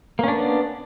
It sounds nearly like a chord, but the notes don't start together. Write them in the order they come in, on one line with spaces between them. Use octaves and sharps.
A#3 C#4 D4 B3